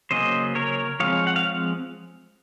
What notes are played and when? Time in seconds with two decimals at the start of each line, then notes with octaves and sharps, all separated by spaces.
0.11 C#3 F#3 A#3 C#4 C5 D#5
0.55 A#4 C#5
1.00 F3 G#3 C4 C#5 F5
1.27 F#5
1.36 F5